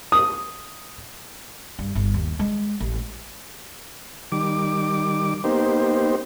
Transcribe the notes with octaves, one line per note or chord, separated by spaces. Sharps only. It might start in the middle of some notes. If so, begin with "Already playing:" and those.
D#6
G2
G1
D#2
G#3
A1
D#3 G3 D6
A#3 B3 D#4 G4 C5